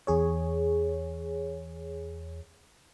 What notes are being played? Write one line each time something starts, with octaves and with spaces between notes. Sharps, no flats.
E2 G#4 C#5